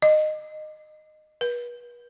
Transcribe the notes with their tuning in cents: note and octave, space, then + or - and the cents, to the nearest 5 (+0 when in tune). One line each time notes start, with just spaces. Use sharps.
D#5 -20
B4 -35